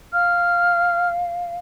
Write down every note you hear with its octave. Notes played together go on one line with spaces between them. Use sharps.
F5 F6